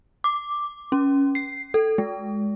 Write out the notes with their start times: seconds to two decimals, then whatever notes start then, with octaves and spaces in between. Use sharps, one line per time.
0.24 D6
0.92 C#4
1.35 C7
1.74 A4
1.98 G#3